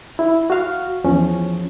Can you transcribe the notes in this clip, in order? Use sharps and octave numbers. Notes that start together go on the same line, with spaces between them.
E4
F#4 F5
E2 F3 C#4